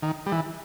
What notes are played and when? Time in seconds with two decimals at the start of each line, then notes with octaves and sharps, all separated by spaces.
0.03 D#3
0.26 G3
0.32 E3